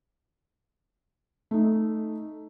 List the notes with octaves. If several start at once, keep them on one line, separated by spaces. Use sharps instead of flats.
A3 D#4